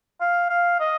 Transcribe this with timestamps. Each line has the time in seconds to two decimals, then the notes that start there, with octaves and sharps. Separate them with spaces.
0.21 F5
0.50 F5
0.80 D#5